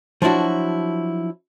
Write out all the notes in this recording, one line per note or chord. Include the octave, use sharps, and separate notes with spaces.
F3 F#3 D4 E4 F#4